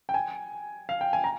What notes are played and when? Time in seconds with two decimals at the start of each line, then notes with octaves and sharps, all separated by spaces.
0.09 G5
0.14 G#5
0.89 F5
1.01 G5
1.13 G#5
1.24 A#5